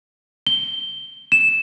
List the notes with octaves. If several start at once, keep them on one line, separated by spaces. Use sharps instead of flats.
G7
E7